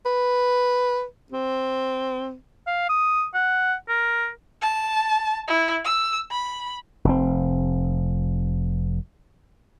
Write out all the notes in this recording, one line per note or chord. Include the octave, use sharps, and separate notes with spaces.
B4
C4
F5
D#6
F#5
A#4
A5
E4
E6
B5
F1 C4